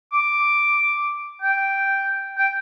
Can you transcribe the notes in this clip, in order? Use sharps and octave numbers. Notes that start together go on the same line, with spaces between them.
D6
G5
G5